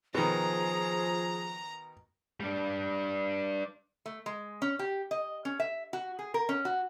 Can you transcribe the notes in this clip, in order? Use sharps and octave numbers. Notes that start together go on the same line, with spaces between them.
B2 D#3 F3 G#4 A#5
G3 D4
A3
G#3
C#4
G4
D#5
C#4
E5
F#4
G#4
A#4
C#4
F#4